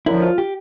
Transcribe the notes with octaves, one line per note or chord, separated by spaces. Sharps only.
F#2 D3 F3 E4
F4
G4